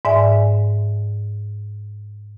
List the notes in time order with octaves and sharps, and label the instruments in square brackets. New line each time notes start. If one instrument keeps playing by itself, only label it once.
[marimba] G#2 D5 E5 G#5